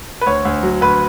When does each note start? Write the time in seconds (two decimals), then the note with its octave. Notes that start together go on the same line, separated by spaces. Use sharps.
0.21 B4
0.26 D2 C#5
0.45 D2
0.63 F#3
0.81 D2 B4